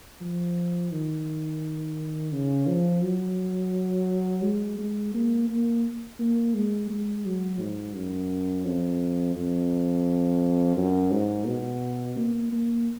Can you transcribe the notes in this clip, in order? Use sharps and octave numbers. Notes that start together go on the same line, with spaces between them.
F3
D#3
C#3
F3
F#3
G#3
G#3
A#3
A#3
A#3
G#3
G#3
F#3
G#2
F#2
F2
F2
F#2
G#2
B2
A#3
A#3